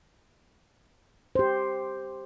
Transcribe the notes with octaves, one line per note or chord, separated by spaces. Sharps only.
G4 C5